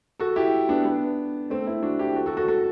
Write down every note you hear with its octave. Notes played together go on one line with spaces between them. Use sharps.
F#4 A4
E4 G4
B3 D4
B3 D4
A3 C4
C4 E4
D4 F#4
E4 G4
F#4 A4
F#4 A4
F#4 A4
F#4 A4